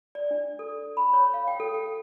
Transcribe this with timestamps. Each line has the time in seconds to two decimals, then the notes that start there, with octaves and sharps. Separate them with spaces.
0.15 D5
0.31 D4
0.59 A4
0.97 B5
1.13 C#5
1.34 F5
1.48 G5
1.60 A4
1.74 G5